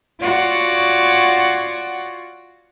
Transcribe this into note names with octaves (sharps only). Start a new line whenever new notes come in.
F4 F#4 C#5 D5 F#5